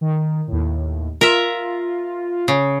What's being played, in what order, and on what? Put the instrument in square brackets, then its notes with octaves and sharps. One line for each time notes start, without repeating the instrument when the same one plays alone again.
[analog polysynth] D#3
D#2 A2
[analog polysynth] F4 [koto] A#4 E5
[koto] C#3